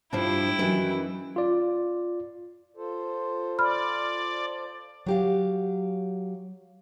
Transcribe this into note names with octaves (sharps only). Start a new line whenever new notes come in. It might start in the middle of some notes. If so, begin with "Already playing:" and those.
G2 F3 D4 E4 G5
F#2 D#3 E3 B3
F4 D5
F4 A4 C5
D5 B5 F6
F#3 G4 F5